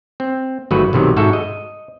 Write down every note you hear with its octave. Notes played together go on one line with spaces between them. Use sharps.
C4
G1 D#3 F#3 A3 F#4 B4
B1 C3 D#3 F#3
G#2 F#4 A4 E5
D#5